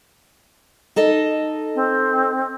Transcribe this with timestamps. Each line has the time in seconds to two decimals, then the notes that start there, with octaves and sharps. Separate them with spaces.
0.96 D#4 A4 D#5
1.75 C4